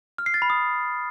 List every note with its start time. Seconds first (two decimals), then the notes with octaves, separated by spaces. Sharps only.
0.18 F6
0.26 C7
0.34 A6
0.42 B5
0.50 D#6